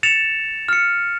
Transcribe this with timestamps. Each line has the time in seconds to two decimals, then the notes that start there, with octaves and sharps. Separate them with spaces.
0.03 A6 C#7 E7 F7
0.69 F6 C#7